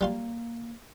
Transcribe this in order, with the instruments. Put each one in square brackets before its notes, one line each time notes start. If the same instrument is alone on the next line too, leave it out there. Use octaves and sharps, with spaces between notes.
[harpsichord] G3 F4 C6 [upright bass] A#3